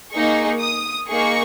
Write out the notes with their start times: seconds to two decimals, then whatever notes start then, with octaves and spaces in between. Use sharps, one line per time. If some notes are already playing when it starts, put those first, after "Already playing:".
0.13 A#3 D#4 G#4 C#6
0.61 D#6
1.09 A#3 D#4 G#4 C#6